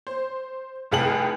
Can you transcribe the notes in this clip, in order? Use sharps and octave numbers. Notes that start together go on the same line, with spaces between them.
C5
F1 C2 G#4 G5 A5 F#7